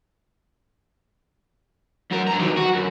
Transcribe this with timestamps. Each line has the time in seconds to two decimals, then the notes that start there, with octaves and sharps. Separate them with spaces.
2.11 F#2 A#4
2.27 G2 A#5
2.40 D#3 F#3
2.57 F#4
2.74 F#2